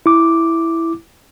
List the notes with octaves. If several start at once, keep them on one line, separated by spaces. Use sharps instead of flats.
E4 D6